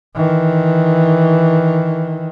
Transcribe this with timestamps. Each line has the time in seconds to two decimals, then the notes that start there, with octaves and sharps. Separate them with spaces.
0.15 D#3 E3